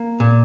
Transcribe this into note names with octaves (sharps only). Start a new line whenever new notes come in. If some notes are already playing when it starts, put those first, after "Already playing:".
Already playing: A#3
A#2